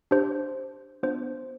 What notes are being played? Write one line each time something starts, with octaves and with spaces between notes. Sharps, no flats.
D4 G4 C5
B3 D4 F4 C5